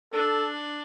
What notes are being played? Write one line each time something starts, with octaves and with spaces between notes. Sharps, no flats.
D4 A4